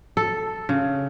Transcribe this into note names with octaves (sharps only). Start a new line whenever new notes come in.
A4
C#3